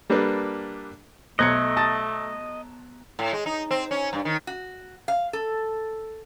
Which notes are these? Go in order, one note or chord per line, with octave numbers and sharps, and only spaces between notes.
G3 A#3 D4 A4 B4
B1 A3 C5 D#5 F#6 G#6 C#7
A5 D#6 A6
A2
G#3
D#4
C4
C#4
G2
D#3
F#4
F5
A4